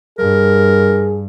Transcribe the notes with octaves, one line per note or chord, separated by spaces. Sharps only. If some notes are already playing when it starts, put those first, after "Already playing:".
G2 G#4 A#4